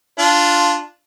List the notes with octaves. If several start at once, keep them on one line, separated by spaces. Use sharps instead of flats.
D4 F4